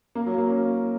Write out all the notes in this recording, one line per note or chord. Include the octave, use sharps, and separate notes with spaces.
A#3
F#3
A#3
C#4